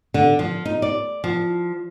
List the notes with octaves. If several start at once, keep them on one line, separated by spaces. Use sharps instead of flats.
D3
F3
D#4
D5
F3